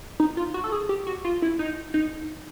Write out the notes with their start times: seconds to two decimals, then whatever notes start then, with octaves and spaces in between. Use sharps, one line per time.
0.20 D#4
0.37 F4
0.54 F#4
0.64 A4
0.72 G#4
0.89 G4
1.07 F#4
1.24 F4
1.42 E4
1.59 D#4
1.94 D#4